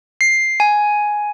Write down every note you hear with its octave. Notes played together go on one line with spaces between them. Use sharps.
C7
G#5